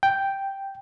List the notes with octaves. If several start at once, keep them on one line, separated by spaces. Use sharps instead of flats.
G5